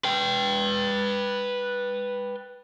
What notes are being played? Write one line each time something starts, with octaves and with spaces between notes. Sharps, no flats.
B4 G5